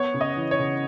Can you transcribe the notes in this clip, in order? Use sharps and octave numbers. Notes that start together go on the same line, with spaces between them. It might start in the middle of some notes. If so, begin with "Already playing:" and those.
Already playing: B3 C#5
C#3
D#5
E3
C#5
C#3